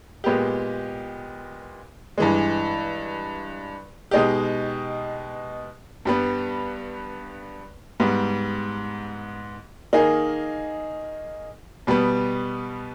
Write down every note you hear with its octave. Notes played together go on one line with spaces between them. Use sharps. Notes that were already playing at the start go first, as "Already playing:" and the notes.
A#2 G#3 B3 G4
G2 E3 G#3
B2 G#3 D#4 G4
G2 G3 B3
G#2 G3 B3
D#3 A#3 D#4 G#4
B2 G3 B3